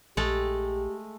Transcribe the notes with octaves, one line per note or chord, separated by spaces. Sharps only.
A#1 G#3 A3 G4 A4